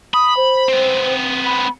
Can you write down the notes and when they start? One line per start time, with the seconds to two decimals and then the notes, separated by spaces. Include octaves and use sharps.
0.14 B5 D#6
0.37 C5
0.69 B3 C4
1.46 B5